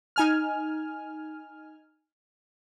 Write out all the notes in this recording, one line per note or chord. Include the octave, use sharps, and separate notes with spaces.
D#4 G#5 F6